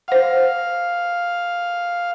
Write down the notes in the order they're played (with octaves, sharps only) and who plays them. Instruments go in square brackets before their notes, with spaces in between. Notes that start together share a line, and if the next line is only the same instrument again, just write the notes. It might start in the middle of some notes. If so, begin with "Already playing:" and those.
[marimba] C5 F#5 [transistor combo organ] F5